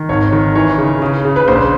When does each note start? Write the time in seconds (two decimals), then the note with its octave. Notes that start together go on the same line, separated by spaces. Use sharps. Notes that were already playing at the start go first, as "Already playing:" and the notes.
Already playing: D#3
0.09 G#1 C#5
0.32 D#3
0.55 E3 C#5
0.78 C#3
1.02 C#3
1.25 C#3
1.36 B4
1.48 A#1 C5